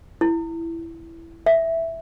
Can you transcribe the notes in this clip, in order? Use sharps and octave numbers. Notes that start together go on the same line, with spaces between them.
E4
E5